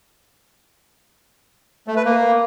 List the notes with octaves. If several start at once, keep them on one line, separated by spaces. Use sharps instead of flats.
A3
B4
A#3